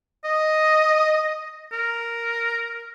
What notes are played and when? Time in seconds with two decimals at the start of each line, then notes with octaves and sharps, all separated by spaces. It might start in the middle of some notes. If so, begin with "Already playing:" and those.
0.25 D#5
1.72 A#4